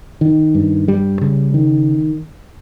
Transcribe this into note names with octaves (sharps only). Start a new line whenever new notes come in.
D#3
G2
G3
C#3
D#3